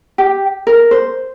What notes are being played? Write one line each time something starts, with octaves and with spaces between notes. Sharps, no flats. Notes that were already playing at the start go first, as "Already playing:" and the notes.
G4
A#4
C5